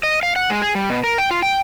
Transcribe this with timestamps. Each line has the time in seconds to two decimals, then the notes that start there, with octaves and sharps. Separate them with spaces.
0.03 D#5
0.23 F5
0.36 F#5
0.50 G#3
0.62 G#4
0.75 G3
0.90 B2
1.04 A#4
1.18 G5
1.31 F4
1.42 G5